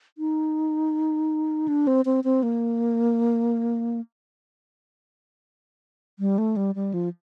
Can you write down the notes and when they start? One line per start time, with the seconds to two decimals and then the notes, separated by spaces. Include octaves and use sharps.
0.18 D#4
1.68 D4
1.87 C4
2.05 C4
2.24 C4
2.43 A#3
6.19 G3
6.38 A3
6.56 G3
6.75 G3
6.94 F3